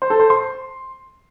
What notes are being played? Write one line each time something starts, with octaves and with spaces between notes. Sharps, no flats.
C5
A4
C5
C6